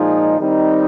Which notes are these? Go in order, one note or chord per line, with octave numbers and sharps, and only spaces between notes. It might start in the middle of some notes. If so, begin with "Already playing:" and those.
Already playing: A#2 F3 G#3 D#4 G#4
D#3 G3 C4 D#4